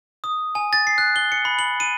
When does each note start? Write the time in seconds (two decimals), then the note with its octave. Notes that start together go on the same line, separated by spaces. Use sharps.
0.24 D#6
0.55 G#5
0.73 A6
0.87 C7
0.98 F#6
1.16 G7
1.32 C#7
1.45 B5
1.59 F#7
1.80 D#7